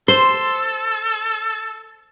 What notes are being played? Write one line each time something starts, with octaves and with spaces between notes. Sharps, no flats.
A4 C5 C6